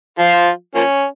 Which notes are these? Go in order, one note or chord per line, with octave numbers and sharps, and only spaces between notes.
F3 F4
F3 A#3 C#4